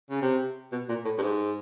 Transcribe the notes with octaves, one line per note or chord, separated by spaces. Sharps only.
C#3
C3
B2
A#2
A2
G2
G#2